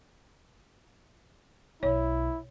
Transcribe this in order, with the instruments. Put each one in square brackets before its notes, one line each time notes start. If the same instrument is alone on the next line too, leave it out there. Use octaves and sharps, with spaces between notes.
[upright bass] B1 [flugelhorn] E4 [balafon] C#5